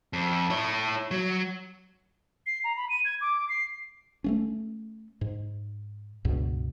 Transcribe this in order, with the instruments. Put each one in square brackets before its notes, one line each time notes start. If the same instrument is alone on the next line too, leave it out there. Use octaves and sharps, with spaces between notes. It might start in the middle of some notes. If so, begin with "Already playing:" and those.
[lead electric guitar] F2
E4 C#5
F#3
[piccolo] C7
A#5
B5
D#7
G#6
D6
C7
[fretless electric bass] A3 A#3 C#4
G#2
C#2 G2 B2